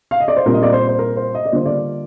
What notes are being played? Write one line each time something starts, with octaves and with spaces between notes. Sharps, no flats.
F5
D#5
D5
C5
A#2 G3 C4 F4 A#4
D#5
D5
C5
C5
A#4
C5
D#5
D5
D3 G3 A#3 D4 F4 C5
D5